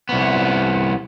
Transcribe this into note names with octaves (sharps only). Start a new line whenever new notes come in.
C2 B3